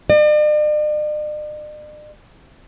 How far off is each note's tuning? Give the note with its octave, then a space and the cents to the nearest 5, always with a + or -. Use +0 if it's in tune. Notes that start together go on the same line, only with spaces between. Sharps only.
D5 +45